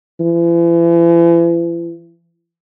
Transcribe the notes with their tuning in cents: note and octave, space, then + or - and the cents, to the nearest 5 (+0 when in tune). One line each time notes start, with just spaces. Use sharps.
E3 +40